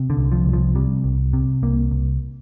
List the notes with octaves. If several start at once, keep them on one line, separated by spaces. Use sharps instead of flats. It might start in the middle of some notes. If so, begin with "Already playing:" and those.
Already playing: C3
D3
C2
F3
C2
F3
C3 G3
C2
C3
C2 A#3
C2